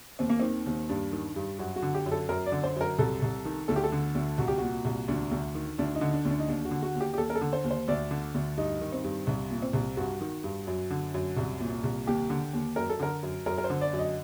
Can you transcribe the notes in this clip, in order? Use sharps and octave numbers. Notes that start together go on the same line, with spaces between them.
D#2 C4
A#3
D#3 C4
D#2
G2 D4
D#3
G2
F#2 F#4
F#4
D3
G4
F#2
A4
F#2 A#4
D5
D3
C5
F#2 A#4
C2 A4
C2
D#3
D2 A4
G4
A4
D3
D2
C2 F#4
G4
A#2 F#4
C2
D2 D4
D2
D#3
D2 D4
D#4
D3
D4
D2
D4
D#4
D#2 D4
F#4
D3
F#4
D#2
G4
G4
D#2 A4
A#4
A4
D3
C5
D#2
C5
D2 D5
D3
D2
G2 D#4
D#3
C4
G2
C2
A#2
C4
C2
G2 F#4
D#3
G2
F#2
D3
F#2
C2
A#2
C2
D#2 G4
D3
D#2
F#2 A#4
A4
D3 A#4
F#2
F#2 A#4
A#4
C5
D3
D5
F#2
D#5